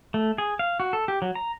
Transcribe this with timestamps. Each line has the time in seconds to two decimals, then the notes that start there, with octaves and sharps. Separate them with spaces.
0.14 A3
0.38 G#4
0.59 F5
0.80 F#4
0.93 A4
1.08 G4
1.22 F#3
1.35 A#5